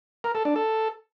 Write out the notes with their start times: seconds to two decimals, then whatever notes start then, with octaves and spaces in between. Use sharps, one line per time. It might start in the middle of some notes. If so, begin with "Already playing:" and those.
0.24 A#4
0.35 A4
0.45 D4
0.56 A4